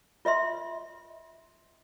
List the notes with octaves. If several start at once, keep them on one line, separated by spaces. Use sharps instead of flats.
F4 D#5 E5 C6